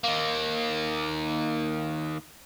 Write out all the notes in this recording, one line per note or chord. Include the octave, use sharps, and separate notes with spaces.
D#3 A#3